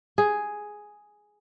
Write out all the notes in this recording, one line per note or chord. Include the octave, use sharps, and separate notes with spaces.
G#4